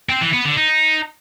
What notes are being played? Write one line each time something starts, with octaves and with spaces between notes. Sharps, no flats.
C4
E3
B3
D3
D#4